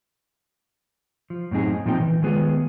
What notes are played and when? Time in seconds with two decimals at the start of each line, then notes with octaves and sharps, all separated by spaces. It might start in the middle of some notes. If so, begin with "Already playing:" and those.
1.30 F3
1.51 F#2 A2 C4 D#4 G#4
1.86 A#2 F3 C4 D#4 A4 G5
2.00 E3
2.22 D#3 G#3 B3 F4 G#4 B4